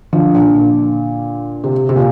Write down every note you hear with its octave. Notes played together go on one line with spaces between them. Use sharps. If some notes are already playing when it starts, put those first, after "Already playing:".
D3 F3
A#2 D3
C3
C3
A#2